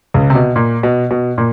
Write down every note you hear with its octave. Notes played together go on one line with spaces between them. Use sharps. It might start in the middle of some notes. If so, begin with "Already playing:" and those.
C#2 C#3
C3
B2
A#2
B2
B2
A#2